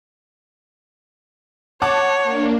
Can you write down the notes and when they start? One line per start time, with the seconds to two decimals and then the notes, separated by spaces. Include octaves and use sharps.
1.82 C#5 F#5 A5 D6
2.23 A#3 D4